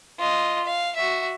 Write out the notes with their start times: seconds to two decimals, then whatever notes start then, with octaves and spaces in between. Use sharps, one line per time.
0.19 F4 D#5
0.64 F5
0.96 F#4 E5